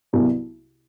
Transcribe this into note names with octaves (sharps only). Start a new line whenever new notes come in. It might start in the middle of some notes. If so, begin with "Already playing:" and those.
C2 C3 F#3 B3 F#4